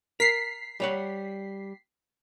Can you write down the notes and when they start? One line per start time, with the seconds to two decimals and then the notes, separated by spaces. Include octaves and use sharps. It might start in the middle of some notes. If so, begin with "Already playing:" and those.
0.20 A#4 B6 C7
0.80 G3 C#5 F#5